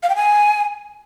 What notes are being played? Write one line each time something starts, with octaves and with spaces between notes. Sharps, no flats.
F5
G5
G#5